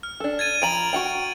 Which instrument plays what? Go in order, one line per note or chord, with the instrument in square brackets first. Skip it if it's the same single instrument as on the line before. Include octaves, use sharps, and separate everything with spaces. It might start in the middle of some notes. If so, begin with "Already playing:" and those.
[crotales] F6
[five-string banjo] D4 A4
[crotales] G#6 A6 D#7
[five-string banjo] F3 A#5 B5 [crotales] D7 F7 F#7
[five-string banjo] F#4 F#5 G5 [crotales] D7